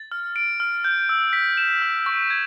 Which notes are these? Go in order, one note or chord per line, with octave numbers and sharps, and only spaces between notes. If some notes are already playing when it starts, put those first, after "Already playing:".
Already playing: A6
F6
D7
F6
G6
E6
B6
E7
F6
C#6
G#6